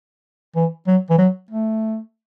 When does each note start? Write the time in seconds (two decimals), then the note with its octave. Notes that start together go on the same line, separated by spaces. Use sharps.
0.56 E3
0.87 F#3
1.10 E3
1.18 F#3
1.50 A3